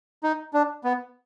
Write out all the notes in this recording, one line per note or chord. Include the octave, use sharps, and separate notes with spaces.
D#4
D4
B3